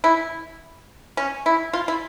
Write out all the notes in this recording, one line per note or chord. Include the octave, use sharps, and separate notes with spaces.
E4
C#4
E4
F4
E4